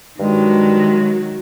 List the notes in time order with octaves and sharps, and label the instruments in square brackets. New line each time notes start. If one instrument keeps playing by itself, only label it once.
[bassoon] G2 [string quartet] D#3 F#3 [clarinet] G#3